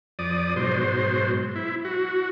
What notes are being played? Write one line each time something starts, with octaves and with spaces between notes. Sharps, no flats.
F2 D5 D#6
G#2 B2 F#3 C5
E4
F#4